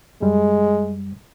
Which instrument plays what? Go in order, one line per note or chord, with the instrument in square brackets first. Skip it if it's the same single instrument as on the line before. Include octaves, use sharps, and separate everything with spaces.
[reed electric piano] F#2 G3 [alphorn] G#3